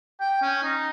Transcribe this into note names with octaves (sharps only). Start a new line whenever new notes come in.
G5
C#4
D#4